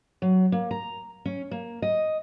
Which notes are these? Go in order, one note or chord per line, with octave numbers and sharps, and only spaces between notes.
F#3
A#3
A#5
C#4
A#3
D#5